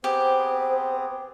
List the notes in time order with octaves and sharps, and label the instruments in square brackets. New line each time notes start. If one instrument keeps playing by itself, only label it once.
[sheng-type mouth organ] B3 C4 G#4 [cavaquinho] G4 [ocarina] C5